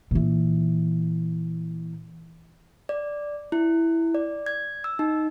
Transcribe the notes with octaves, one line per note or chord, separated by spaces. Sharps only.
A#2 E3
D5
E4
D5
G#6
E6
D#4